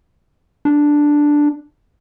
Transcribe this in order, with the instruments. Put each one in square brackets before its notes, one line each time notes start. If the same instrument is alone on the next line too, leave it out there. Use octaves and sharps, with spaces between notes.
[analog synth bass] D4